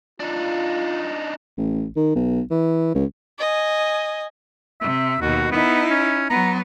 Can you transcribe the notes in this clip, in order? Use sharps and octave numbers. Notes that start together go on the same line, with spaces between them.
D4 D#4 F4
A1
D#3
B1
E3
C#2
D#5 G#5
C3 E5
D#2 B2 F#4
B3 D#4 E4
C#4
F#3 B3 A#5